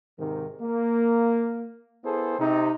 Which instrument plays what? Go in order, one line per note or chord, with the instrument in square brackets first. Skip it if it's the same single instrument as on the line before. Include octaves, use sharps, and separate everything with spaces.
[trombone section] G#2 C3 D#3
A#3
B3 E4 G#4 A4 C5
C3 D#4